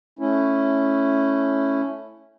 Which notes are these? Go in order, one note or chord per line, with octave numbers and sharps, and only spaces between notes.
A3 C#4 E4